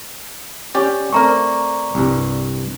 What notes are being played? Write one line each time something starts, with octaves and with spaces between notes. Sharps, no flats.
C#4 G4 D5
A3 C4 A#4 D5 A#5 C#6
C2 G2